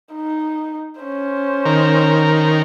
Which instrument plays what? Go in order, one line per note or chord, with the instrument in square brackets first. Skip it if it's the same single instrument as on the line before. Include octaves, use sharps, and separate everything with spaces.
[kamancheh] D#4
C#4 C5
[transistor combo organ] D#3 A#4